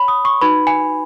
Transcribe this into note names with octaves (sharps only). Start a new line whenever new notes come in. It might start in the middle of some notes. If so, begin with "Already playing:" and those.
Already playing: C#5 B5
D#6
C#6
D#4 F#4 B4 B5
G#5